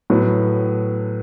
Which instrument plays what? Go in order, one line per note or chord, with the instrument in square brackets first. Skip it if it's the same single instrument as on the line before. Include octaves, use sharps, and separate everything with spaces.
[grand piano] A2 F#3 B3